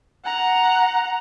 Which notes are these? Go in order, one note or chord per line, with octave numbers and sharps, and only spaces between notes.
F#5 A#5